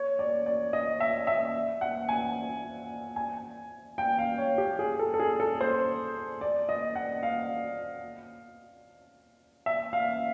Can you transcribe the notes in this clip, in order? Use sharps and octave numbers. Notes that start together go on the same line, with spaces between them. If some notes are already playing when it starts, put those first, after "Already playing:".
Already playing: C#5
D5
D5
D#5
E5
E5
F#5
G#5
G#5
G5
F5
C#5
G4
G#4
A4
A4
G#4
A4
C5
D5
D#5
F#5
F5
E5
F5